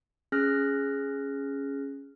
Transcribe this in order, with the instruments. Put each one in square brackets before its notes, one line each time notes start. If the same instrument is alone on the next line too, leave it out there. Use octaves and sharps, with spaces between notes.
[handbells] C#4 G#4 F6 F#6 A#6